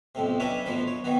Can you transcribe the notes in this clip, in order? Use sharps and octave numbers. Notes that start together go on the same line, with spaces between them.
B1 F2 A2 C3
C#4 D4 B4 C#5 D#5 E5
A1 B2 F3 F#3 B4
C#5
B2 D#3 E3 B3 F#4